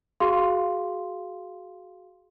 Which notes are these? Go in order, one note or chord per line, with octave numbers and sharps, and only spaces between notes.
F#4 G#4 F5 C6